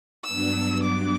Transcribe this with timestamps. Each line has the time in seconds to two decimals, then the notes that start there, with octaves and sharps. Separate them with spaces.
0.24 G2 F#3 B3 D4 E6
0.84 D6